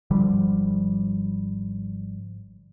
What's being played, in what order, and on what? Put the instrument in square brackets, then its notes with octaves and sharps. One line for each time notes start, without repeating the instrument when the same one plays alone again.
[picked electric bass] G#1 D3 F3 G3